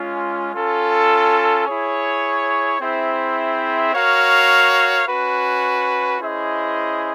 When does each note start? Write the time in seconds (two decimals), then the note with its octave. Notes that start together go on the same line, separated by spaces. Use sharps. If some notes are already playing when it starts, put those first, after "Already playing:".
Already playing: G#3 C#4 F4
0.54 C#4 F4 A4
1.67 E4 G#4 C#5
2.79 C4 E4 G#4 C5 E5
3.93 F#4 A#4 C#5 F5
5.05 C#4 F#4 B4
6.19 C#4 E4 G#4 C5 D#5